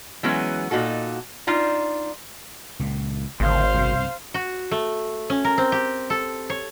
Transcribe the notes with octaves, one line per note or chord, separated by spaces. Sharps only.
E3 F#3 G#3 B3 C#4
A#2 D#3 D#4 F#4 A4
D4 D#4 F4
C#2 A#2
G#1 D2 A2 C#3 C5 F5
C2 G2 B2
F#4
A3
C#4
A#4
C4
G4
A4
C#5